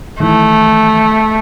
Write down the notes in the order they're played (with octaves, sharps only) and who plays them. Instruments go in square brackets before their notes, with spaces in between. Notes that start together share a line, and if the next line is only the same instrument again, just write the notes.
[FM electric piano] D#3 E3 [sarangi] A3